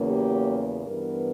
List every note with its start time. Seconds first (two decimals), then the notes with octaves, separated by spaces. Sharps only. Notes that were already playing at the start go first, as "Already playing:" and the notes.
Already playing: E2 C#3 F#3 A#3 C#4
0.09 G4
0.87 G2 E3 B3 A#4